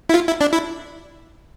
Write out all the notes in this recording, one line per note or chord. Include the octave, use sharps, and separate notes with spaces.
E4
F4
E4
D4
E4